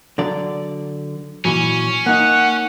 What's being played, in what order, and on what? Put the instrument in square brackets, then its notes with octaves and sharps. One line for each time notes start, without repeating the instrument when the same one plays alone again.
[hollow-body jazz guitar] D3 F#3 D5
[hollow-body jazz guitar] A#2 E3 F#3 [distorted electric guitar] C#4
[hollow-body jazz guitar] A#3 D#4 [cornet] F#5